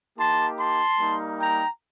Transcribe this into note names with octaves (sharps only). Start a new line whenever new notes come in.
A#3 D#4 G4 A5 C6
A5 C6
G3 A#3 D#4
G5 A#5